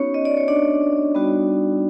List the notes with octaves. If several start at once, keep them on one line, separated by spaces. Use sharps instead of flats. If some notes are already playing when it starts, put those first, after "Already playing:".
Already playing: B3 C#4 D#4 F#4 C#5
D#5
D5
C#5
D4 D5
G3 B3 D#4 F#4